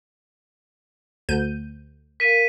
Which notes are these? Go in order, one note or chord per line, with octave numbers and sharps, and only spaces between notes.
D2 G6 D#7
A#4 F5 B6 D#7